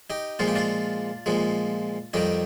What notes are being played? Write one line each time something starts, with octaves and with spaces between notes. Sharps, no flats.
D#4 G4
A#2 F3 G#3 F4
G4
D4 F4
A#2 F3 G#3
F2 D#3 G3 D#4 G4